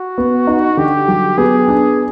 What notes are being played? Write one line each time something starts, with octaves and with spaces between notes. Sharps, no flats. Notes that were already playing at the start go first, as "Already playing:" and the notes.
Already playing: F#4
B3
D#4
D3 G4
F#3
B3 G#4
D4